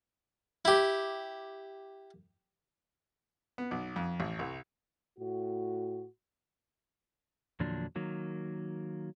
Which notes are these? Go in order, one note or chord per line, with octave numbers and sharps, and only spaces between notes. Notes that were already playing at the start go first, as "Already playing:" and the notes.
E4 G4
B3
B1
F2
A1
C2
A2 F#4
E2 A#2 D3 F3 F#3 D4
D#3 F#3 A#3